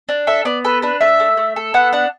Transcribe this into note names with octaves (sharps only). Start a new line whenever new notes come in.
D4
A4 E5
B3 D5
A4 B4
D4 B4
A3 E5
A3
A3
A4
B3 F#5
D4 F#5